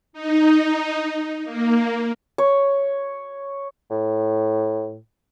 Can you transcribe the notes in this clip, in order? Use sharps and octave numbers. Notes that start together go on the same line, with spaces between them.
D#4
A#3
C#5
A2